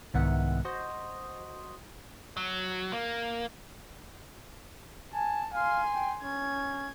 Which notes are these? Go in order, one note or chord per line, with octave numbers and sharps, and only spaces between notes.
C2 G#2 D#3 B3 E5 F#5
F#4 C5 D#5
F#3
A#3
G#5 A5
F5 G#5 C6
G5
C#4 G#6